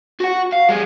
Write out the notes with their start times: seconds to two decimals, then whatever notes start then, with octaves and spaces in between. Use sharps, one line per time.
0.20 F#4 F#5
0.53 F5
0.69 G3 G#4